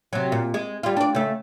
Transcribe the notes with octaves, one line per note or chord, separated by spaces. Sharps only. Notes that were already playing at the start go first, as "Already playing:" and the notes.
C3 F#3
A#2
G#3
G3 F4
D4 D5
C#3 A3